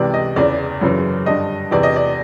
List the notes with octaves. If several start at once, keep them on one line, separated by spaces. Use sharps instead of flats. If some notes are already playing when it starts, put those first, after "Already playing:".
Already playing: C#2 C3 E3 D5
D#5
E2 C#3 E3 D5
F#2 C#3 E3
G2 D3 D#5
E2 C3 E3 D5
D#5
D5